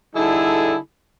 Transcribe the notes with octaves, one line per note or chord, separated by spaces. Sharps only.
D3 G3 D#4 E4 G#4 A4